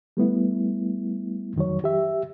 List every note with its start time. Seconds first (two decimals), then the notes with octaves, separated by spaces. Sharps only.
0.17 G3 A3 B3 E4
1.56 F2 D#3 F#3 C#5
1.84 G4 E5